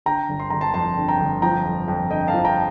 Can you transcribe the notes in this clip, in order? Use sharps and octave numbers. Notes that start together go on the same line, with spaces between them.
D3 G5 A#5
G1
C6
G1 A#5
A5 C6
F2 A5 C6
D3
G5 A#5
G1
F3 G5 A#5
F2
F2
D3 D#5 G5
F5 A5
F3
G5 A#5